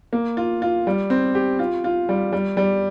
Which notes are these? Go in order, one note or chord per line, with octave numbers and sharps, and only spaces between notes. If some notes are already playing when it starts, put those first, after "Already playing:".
A#3
F4
F4
G3
C4
G4
F4
F4
G3
G3
G3